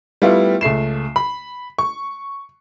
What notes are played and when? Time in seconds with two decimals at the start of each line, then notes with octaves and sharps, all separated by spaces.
0.22 G3 A3 B3 E4 F4
0.61 C#2 A3 C7 E7
1.16 B5
1.78 C#6